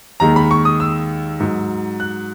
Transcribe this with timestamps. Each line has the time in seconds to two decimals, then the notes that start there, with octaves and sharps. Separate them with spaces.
0.20 D#2 D#3 G#3 A#5
0.36 B5
0.51 C#6
0.65 D#6
0.80 E6
1.40 G#2 F#3
2.00 F#6